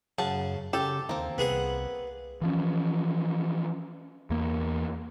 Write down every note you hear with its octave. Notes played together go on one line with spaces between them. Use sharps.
F#2 C#3 F#5 A5
C#3 G4 A4
D#2 A#3 C4
C2 B3 G#4 F#5
E3 F3 C#4
E2 A#3